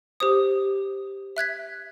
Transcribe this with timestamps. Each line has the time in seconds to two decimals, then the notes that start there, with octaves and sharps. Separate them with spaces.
0.20 G4 C5 D#6
1.37 E5 F#6 G#6 B6